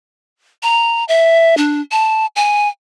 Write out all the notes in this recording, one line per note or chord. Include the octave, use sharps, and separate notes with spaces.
A#5
E5
D4
A5
G#5